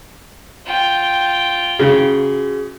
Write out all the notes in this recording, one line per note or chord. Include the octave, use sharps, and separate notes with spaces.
F4 G5
C#3 F#4 G#4